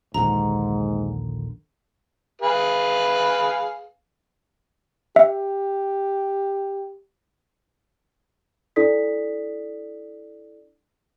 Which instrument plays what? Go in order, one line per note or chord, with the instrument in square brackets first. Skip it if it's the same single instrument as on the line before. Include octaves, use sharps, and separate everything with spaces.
[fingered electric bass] A#1 D#2 D3 [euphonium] G#2 [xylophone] A#5
[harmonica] G#4 B4 F5
[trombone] G4 [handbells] E5
[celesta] D4 E4 A4 D5 D#6 B6